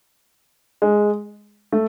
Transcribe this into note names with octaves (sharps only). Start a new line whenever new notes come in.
G#3
A3